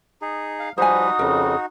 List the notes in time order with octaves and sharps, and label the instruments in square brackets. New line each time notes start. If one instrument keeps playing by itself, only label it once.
[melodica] D#4 G#4
[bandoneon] F5
[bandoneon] F3 G3 B4 [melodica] D#4 F#4 [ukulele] C5 G#5 [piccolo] D#6
[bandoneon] F2 C#3 [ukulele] A#4